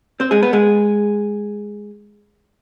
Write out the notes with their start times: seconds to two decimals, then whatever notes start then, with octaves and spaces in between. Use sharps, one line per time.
0.20 C4 C5
0.31 G#3 G#4
0.43 B3 B4
0.53 G#3 G#4